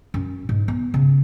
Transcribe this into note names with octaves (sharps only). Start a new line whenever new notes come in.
F#2
G#2
B3
C#3